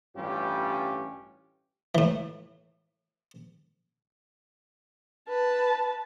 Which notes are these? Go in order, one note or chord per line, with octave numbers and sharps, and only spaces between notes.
A1 G2 G3 C#4 F4 G4
A2 E3
B4 A5